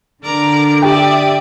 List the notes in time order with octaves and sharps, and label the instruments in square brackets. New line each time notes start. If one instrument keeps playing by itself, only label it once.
[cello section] D3 [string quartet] A#4 D5 A#5
[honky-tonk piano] G4 G5 [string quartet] D5 E5 D#6